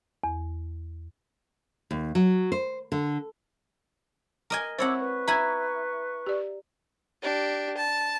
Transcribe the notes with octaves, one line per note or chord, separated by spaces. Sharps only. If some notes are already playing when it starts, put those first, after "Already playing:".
E2
D#2
F#3
C5
D3
A#4 D#5 G#5
C4 E4 C5 C#5 F#5 D6 E6
B4 C#6
E4 G#5 A#5 B5 G#6
G4 D5
D4 G4
A5